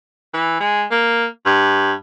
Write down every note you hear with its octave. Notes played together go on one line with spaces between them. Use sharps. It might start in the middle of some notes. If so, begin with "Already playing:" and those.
E3
G#3
A#3
G2